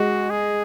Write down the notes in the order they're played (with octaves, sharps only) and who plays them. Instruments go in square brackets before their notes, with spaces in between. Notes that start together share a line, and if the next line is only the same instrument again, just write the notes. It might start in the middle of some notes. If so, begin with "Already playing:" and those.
Already playing: [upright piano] G#3 [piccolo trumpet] F#4
[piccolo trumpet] G#4